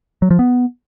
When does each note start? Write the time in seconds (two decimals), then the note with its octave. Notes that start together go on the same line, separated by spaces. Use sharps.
0.22 F#3
0.31 F3
0.39 B3